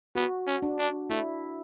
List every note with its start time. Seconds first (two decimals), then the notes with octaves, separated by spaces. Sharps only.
0.15 B3 F#4
0.47 C#4
0.62 D4
0.79 D4
1.10 A3 E4